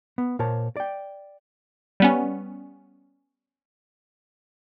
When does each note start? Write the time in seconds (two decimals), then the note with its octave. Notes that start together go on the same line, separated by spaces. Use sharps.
0.18 B3
0.39 A#2 A#4 C5 C#5 A5
0.77 D5 G5
2.00 G3 B3 C#4